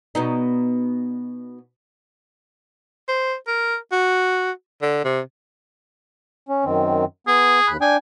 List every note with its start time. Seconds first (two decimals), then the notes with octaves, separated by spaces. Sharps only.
0.15 B2 B3 D#4
3.08 C5
3.47 A#4
3.92 F#4
4.82 D3
5.05 C3
6.49 C#4
6.65 F#2 D#3 C4
7.27 B3 G#4
7.68 D#2 B5 F#6
7.81 D4 G5 G#5